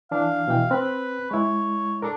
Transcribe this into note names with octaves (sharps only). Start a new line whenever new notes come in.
E3 D4 F5
B2 E3 G5
C4 B4
G#3 E4 C#5
D4 A4 A#4